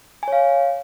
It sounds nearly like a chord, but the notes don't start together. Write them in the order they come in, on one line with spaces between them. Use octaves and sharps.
G#5 C#5 F5